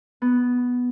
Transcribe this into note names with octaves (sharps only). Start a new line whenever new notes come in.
B3